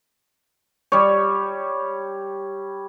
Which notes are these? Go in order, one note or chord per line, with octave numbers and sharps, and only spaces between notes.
G3 C#5